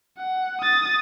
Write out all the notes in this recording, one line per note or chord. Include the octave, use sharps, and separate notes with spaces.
F#5
D#6 A6